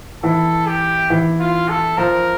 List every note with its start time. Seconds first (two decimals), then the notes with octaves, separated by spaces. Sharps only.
0.23 E3 A4
0.67 G4
1.10 E3
1.40 F4
1.69 A4
1.97 F3 A#4